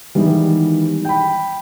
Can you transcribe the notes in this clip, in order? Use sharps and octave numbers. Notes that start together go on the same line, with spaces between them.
D#3 E3 G3 G#3 B3
G5 B5